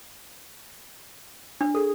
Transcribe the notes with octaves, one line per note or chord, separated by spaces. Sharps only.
D4
G#4 A4